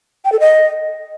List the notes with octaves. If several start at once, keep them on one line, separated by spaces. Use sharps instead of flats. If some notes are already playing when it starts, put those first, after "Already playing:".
G5
A4
D#5